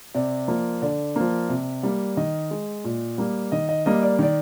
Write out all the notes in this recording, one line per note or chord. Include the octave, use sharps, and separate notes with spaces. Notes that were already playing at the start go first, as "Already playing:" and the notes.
C3 D5
F3 A#3
D3 D5
F3 A#3
C3
G3 A#3
D#3 D#5
G#3
A#2
G3 A#3
D#3 D#5
D#5
G3 A#3 D#5
D5
D#3 D5